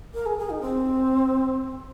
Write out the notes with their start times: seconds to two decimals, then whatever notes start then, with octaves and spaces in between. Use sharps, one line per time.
0.15 A#4
0.26 G#4
0.39 G#4
0.50 D#4
0.61 C4